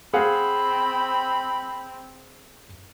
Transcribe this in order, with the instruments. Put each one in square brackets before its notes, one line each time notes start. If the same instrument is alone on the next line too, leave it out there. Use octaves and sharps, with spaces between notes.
[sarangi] C4 [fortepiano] G#4 F5 F#5 [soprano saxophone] B5